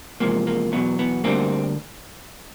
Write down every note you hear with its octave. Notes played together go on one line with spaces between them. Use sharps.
E2 C3 F3 G#3 A#3
A#3
E2 B2 F#3 B3
B3
D2 D3 G3 A#3 C4